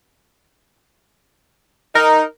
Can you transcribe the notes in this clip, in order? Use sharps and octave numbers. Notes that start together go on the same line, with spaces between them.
D#4 A#4